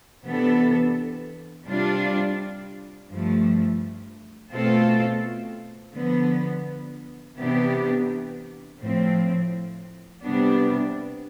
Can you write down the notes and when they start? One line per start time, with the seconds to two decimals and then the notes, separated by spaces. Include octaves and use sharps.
0.24 C3 E3 B3 D4 A4
1.67 C3 G3 D4 F4
3.09 G2 F3 A3
4.52 B2 A3 C4 F4 A4
5.95 D3 F3 B3
7.37 C3 E3 B3 D4 G4
8.80 A2 F3 C4
10.23 C3 G3 B3 D4